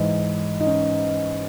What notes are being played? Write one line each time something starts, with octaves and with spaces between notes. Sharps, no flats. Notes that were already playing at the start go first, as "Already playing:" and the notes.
Already playing: G#2 E3 D#4
D#4
C#4